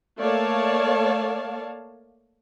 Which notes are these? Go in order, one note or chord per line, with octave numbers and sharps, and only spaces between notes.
A3 A#3 C#5 D5 F5 A5